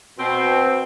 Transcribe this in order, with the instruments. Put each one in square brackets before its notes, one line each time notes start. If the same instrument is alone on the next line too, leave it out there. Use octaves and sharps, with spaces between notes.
[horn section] B2 C4